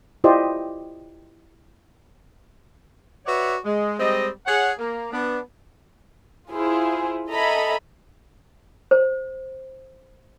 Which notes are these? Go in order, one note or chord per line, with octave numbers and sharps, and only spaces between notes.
E4 F4 G4 C5 D5 D#5
F#4 B4 C#5 D5 E5 F#5
G#3
G3 G#3 C4 C5 D#5
G#4 C#5 F#5
A#3
B3 D4
E4 F4 G#4 C5
A4 D#5 E5 G#5 A#5 B5
C5